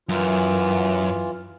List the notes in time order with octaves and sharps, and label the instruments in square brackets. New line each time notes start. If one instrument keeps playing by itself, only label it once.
[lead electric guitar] F#2 [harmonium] E3 F4